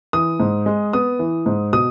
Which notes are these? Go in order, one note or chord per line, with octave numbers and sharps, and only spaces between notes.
E3 D#6
G#2
G#3
B3 D#6
E3
G#2
B2 D#6